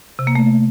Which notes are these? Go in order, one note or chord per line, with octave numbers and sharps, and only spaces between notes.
C3
A#3
A3